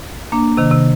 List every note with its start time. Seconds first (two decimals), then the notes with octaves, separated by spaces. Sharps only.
0.32 A#3 D4
0.57 C3 D#3
0.71 C3